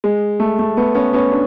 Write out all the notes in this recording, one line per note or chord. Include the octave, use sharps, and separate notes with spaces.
G#3
A3
A3
A3 B3
B3 C#4
B3 C#4
D4